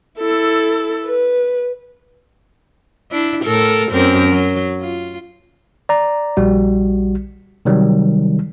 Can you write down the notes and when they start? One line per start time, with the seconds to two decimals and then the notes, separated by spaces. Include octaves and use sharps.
0.19 E4 A4
1.06 B4
3.11 D4 E4
3.44 A2 A4 A#4
3.91 F#2 C4 A#4
4.30 F#3
4.81 F4
5.89 D5 A#5
6.37 A#1 G3 F#4
7.65 C3 D#3 F#3 G3